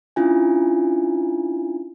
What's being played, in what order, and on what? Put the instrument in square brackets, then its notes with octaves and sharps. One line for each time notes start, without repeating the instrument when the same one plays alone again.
[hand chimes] C#4 D4 E4 F4 G#5